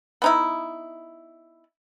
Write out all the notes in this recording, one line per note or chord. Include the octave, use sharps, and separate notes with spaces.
B3 D#4 E4